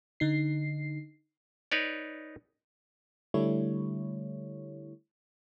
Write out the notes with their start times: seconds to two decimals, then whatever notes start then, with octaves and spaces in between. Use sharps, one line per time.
0.20 D3 D#4 C7
1.72 D#4 B4 C#5 D5
3.34 D3 G3 A3 E4 C#5